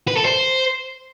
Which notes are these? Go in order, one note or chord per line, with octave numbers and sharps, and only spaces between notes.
B4
A4
C5